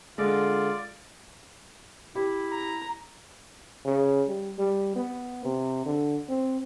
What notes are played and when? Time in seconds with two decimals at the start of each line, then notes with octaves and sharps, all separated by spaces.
0.18 D3 G#3 F4 D5
2.15 E4 G4
2.52 A#5
3.85 C#3
4.28 G3
4.58 G3
4.96 B3
5.44 C3
5.86 D3
6.29 C4